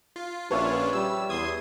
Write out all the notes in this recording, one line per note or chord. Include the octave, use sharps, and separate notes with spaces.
F4
A#1 C#4 D4 F4 B4 C#5 E5
G3 E6
E2 C6 D#6 G#6